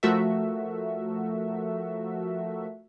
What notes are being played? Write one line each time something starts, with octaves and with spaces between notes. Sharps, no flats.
F3 A3 F#4 A4 A#4 E5